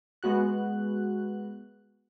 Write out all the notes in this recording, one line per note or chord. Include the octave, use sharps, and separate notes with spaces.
G#3 B3 F#4 F#6